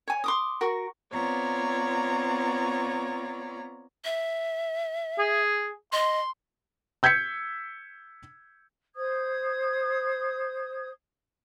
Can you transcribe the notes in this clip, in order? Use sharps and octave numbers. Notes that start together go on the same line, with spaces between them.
C#5 G#5
C6 D6 D#6
F#4 A#4 C#6
B3 C4 F4 C#5 D5 A#5
E5
G#4
D#5 C6
E6 G6 G#6 B6 C#7
C5 D#6 G#6